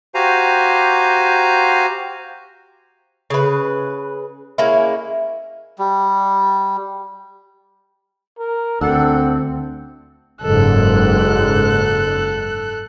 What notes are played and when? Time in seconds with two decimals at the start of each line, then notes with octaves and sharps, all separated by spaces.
0.15 F#4 G4 C5 F5 G#5 A#5
3.30 C#3 B4
4.58 G#3 A#3 C#4 E4
5.78 G3
8.39 A#4
8.81 D2 C4 D4 A4 F#5
10.42 F#1 G#2 A4 F#6